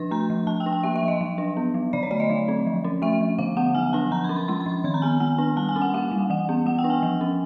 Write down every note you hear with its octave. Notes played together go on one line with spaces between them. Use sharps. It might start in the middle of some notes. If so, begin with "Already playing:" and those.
Already playing: F3 D4 C6
A3 A#5
F3
F3 A5
G5
D4
G5
A#3 E5
E5
F3
D#5
F#3
D4
B3
F#3
D3 D5
C#5
A3 D5
D#5
F#3
C4
F3
C#4
A3 E5
F3
D3 F5
B3 F#5
F#3 G#5
D4 A5
F3 A#5
B5
C#4
C6
G#3 C6
C6
F3
C6
D#3 B5
A#5
B3 G#5
G#3 G#5
D4 G#5
G3 A5
G#5
C#4
F#5
A#3 F5
G3
E3 F#5
B3
G#3 F#5
G5
D4
G#5
F3
C#4